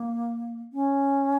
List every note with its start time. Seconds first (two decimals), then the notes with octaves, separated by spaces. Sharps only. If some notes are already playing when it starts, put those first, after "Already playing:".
Already playing: A#3
0.73 C#4